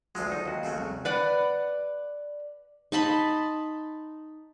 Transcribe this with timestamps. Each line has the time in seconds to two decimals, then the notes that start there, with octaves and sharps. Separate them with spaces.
0.15 D2 F#3 G#3 F4 A4
0.32 D#4
0.45 D#2 F#4
0.63 C#3 F#3 A3
0.78 C2
1.05 B4 D5 F#5
2.92 D#4 A5 B5 C6